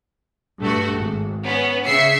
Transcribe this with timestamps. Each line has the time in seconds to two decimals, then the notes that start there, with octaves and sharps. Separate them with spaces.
0.60 G2 A3 F#4
0.96 G#1
1.44 B3 C#4
1.86 C#3 E5 C7 C#7